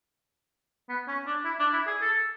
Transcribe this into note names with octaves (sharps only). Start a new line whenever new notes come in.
B3
C#4
D4
E4
D4
E4
G#4
A4